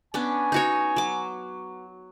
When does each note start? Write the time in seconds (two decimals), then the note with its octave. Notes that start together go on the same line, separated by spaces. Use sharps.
0.14 B3 C#4 D4 G#5
0.52 D#4 F#4 C#5
0.96 F#3 D6